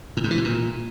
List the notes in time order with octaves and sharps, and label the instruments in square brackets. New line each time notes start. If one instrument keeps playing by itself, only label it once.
[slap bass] A2
G#2
E3
B2
A#2